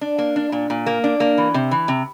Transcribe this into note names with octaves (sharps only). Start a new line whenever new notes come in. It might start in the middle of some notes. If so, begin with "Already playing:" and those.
D4
A#3
D4
A#2
A#2
A#3
D4
A#3
E3
C3
E3
C3